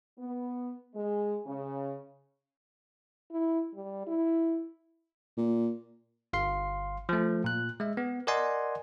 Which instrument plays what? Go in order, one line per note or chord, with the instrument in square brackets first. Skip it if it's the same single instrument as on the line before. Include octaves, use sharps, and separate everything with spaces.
[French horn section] B3
G#3
C#3
[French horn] E4
G3
E4
[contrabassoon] A#2
[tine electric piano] G1 F5 C6 C7
F3 A3
A#2 F#6
G#3 E5
B3
A#4 D5 D#5 F#5 G#5 C6